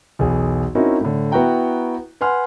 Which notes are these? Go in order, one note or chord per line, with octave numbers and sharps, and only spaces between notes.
B1 E2 G#4
C4 C#4 D#4 E4 F#4 A#4
A2 D3
B3 E4 F#4 F#5 G5 A#5
B4 F#5 G#5 C6 F6